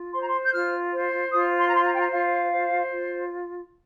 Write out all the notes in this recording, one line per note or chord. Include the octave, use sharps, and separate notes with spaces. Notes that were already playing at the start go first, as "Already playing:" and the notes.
Already playing: F4
C5 C6
A#5
C6
G6
F4 F6
C5
F4 D#6
C6
A#5
C5 C6
A#5
G5
A#5
F4 F5
C5
F4